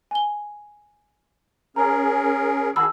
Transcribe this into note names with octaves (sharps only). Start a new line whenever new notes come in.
G#5 G7
C#4 G#4 A#4 A#5
D#3 F#4 G#4 A5 B5 E6